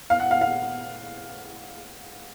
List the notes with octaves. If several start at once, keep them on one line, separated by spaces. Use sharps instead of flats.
F5
F#5
F5
F5